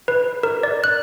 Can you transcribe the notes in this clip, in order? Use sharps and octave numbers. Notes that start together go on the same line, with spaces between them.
B4
A#4
D5
F#6